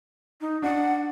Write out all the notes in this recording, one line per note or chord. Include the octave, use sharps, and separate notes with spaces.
D#4
D4 F#5